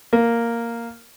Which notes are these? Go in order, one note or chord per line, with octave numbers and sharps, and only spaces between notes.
A#3